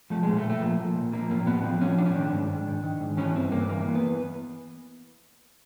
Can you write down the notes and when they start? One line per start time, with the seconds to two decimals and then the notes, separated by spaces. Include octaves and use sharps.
0.10 F3 A3
0.23 A#2 G#3
0.37 A3
0.44 A#2
0.50 A3
0.61 F3 A#3
0.79 F3
0.96 A#2
1.13 F3 A#3
1.31 A2 A#3
1.47 A2 B3
1.64 F3 C4
1.81 F3 C#4
1.98 A2 D4
2.06 C#4
2.13 D#3 D4
2.32 G#2
2.50 G#2
2.67 D#3
2.84 D#3
3.00 G#2
3.17 E3 C#4
3.35 G2 C4
3.51 G2 A#3
3.69 E3 A#3
3.85 E3
3.95 B3